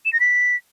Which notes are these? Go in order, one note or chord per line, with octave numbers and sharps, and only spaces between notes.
E7
A#6
B6